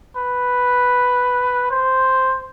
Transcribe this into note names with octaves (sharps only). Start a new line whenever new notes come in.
B4
C5